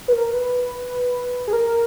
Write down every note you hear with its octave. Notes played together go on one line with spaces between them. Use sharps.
B4
A#4
B4
G#4
A#4